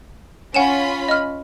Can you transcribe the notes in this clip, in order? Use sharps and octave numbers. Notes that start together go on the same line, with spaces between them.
C#4 F4 F#5 G#5 B5 E7
D#5 F6